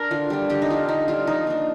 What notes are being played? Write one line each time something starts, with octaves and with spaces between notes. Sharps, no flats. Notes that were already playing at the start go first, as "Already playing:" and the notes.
Already playing: D4 A#4
D3 F4
G3 D4
D3 G4
D#4
G3 D4 F4
D3 D#4
G3 D4 F4
F3 D#4
A#3 D4